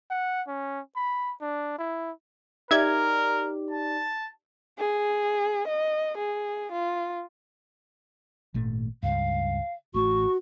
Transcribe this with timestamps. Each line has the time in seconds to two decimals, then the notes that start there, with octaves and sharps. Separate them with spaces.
0.10 F#5
0.47 C#4
0.96 B5
1.41 D4
1.78 E4
2.71 D#4 G4 A#4 D5 E5 G#6
3.71 A5
4.78 G#4
5.68 D#5
6.17 G#4
6.72 F4
8.54 G#1 A#2 A3
9.03 C#2 G2 F5
9.94 A1 A3 F#4 C#6